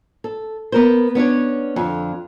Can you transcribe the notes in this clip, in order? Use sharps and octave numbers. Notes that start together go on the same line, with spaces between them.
A4
B3 A#4 C5
B3 C#4 D4 C#5
F2 D3